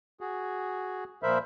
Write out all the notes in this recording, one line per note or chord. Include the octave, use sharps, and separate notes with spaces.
F#4 G#4
A#2 F3 A#4 C5 E5 B5